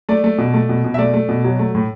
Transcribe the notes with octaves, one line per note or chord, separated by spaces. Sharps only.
A3 D5
A3
B2
A3
B2
B2
E5
A3 D5
A3
B2
F#3
A3
A2